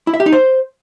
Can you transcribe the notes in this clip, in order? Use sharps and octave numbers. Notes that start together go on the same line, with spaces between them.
E4
E5
G4
D#4
C5